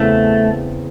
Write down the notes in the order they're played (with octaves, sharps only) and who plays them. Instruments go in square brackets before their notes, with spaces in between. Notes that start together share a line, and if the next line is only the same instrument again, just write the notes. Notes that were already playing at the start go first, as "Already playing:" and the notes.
Already playing: [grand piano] E2 C#3 E3 C4 [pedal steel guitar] A3